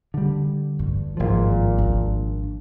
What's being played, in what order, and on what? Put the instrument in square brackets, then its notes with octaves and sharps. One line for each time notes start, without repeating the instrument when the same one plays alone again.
[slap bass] D3 G3
[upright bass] G2
[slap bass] G#1 F3 [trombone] A#2
[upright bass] D4